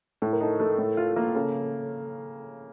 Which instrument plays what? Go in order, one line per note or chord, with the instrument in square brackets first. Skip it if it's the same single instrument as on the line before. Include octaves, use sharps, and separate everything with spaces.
[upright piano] A2 [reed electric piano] A4
[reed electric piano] A#4
[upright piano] D#4 [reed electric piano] A4
[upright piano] A3
A2
F4
A#3
[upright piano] C#3 [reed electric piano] A4